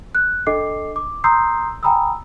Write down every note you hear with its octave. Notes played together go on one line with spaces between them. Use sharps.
F#6
D4 A4 D#5 D6 C7
D6
A#5 C6 D#6 E6 G6 C7
G5 G#5 A#5 B5 D#6 E6